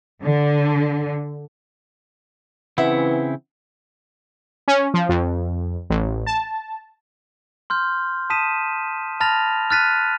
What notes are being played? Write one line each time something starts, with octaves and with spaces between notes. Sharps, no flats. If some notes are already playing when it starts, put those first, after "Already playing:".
D3
C#3 E3 C4 E4 E5 F#5
C#4
F3
F2
A1
A5
C6 F6 G6
A5 D#6 B6 D#7 E7
A5 B5 F6 A6 A#6 F7
F6 F#6 A6 B6 D#7